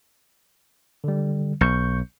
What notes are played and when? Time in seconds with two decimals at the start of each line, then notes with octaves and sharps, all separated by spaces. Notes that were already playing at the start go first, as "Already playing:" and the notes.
1.04 D3 G3
1.61 B1 C#6 G6 C#7